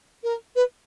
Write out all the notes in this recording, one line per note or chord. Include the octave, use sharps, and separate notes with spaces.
A#4
B4